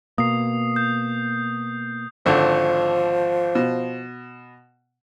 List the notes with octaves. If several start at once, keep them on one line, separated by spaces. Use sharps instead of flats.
B2 A#3 D#6 C7
G6
G#1 D3 F3
B2